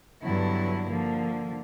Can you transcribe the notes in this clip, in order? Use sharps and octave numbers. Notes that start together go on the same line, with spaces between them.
G2 D3 F#3 B3 E4
D3 F3 A#3